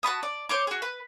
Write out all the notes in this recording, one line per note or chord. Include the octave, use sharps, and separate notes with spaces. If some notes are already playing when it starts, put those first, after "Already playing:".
F#4 A5 B5 D#6
D5
C5 C#5 D6
F#4 G#4
B4